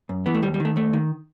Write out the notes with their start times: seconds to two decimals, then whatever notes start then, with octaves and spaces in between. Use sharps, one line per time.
0.09 F#2
0.26 E3 B3
0.34 A3
0.42 D#2 G3
0.54 G3
0.60 D#3
0.65 A3
0.76 D#2 A3
0.93 D#3